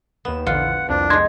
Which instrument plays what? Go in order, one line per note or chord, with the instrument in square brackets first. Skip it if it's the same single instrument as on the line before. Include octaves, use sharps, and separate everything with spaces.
[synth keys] D#2 E7 [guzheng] B3
[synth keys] A#1 E2 D3 [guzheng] F4 [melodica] F#5
[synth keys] C2 F2 [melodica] D4
[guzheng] G#3 D#4 [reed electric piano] C6 G#6